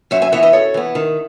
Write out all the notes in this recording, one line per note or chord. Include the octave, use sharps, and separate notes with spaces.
F#2 C#5 E5
E5 G#5
E3 B3 C#5 E5
B4 D#5
F#2 A4 C#5
E3 B3
D#3